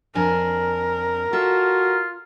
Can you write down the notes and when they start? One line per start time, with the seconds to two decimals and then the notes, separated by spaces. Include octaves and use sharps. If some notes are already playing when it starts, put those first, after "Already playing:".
0.15 F2 D4 A#4 G#5
1.33 F4 F#4 A4 E5